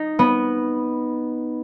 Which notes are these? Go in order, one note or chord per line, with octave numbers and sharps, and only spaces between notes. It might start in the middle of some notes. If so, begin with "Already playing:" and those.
Already playing: D#4
B3